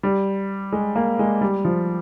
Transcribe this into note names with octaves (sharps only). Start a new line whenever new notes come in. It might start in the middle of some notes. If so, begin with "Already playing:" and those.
G3
G#3
A#3
G#3
G3
F3